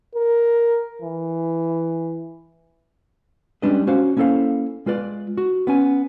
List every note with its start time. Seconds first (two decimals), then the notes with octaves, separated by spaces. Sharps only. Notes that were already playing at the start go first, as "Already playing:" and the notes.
0.16 A#4
1.02 E3
3.62 G3 G#3 C#4 D4 B4 D#5
3.87 C#4 F#4 C5 F5
4.17 A#3 C#4 E4 A4 C5 F5
4.86 G#3 F4 B4 D5
5.37 F#4
5.67 B3 C#4 G#5